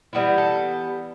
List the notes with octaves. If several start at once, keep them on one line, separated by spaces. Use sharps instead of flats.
E3 G3 B3 E4
A4